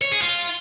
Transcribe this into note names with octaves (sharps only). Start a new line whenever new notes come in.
C#5
G#4
F4